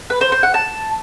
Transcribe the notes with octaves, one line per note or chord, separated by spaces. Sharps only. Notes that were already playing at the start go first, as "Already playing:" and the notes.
B4
C5
C5
F#5
A5